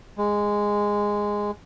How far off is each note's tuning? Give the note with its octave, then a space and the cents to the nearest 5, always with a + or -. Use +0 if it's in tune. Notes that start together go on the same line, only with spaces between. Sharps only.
G#3 -10